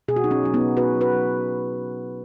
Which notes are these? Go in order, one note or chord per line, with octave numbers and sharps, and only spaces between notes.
B2 G#4
F#4
F#3 D#4
C#4
F#3 C#4
B3 D#4
B2
B2 F#4 B4
F#3
F#4 B4
F#3